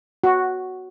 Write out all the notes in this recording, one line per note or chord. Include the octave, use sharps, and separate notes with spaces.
F#4